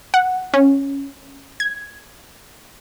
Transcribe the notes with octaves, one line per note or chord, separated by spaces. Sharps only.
F#5
C#4
G#6